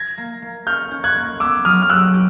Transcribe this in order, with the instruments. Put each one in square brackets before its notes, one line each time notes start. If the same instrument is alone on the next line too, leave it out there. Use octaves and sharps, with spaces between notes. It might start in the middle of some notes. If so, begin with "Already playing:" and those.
Already playing: [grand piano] G#6 A#6
[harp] A#3
A#3
[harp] C#4 [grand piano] F6 G6
[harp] C#4
[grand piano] F#6 G#6
[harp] A#3
[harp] B3 [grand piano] D6 E6
[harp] F#3 [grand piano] D#6 F6
[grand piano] F6
[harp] G4 [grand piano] E6 F#6
[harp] G4